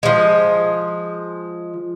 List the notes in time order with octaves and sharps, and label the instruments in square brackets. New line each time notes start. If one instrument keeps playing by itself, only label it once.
[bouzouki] F3 G#3